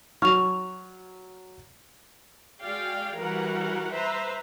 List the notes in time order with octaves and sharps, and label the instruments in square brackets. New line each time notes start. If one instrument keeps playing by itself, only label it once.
[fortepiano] F#3 F6 [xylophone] C#6 F7
[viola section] G#3 F#4 G#4 D5 F5 G5
E3 G3 F#4 A#4 B4 F#5
B4 C5 E5 A#5